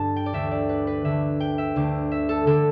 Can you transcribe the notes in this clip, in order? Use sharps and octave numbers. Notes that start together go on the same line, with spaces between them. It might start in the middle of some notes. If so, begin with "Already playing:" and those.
Already playing: G2 D3 A5
G5
D5
D2 D3 E5
D5
B4
B4
D2 D3 E5
G5
E5
D2 D3
E5
A4
D3 A4